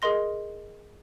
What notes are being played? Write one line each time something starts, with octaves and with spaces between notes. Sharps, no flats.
G#4 A#4 D#5 C6 A#6